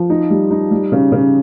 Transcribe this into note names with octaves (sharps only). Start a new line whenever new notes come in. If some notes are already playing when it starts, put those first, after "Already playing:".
Already playing: F3
D#4
G3
D#4
G3
C#3
C#3